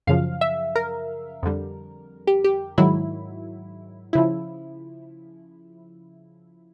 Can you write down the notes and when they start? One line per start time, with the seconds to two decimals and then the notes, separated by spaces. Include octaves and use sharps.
0.07 F#2 C#3 F3 F5
0.41 E5
0.76 A#4
1.43 F2 D3 G3
2.27 G4
2.44 G4
2.78 G#2 D#3 F#3 E4
4.13 C#3 F3 E4